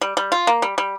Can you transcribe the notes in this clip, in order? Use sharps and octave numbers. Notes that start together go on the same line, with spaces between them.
G3
G3
F4
A#3
G3
G3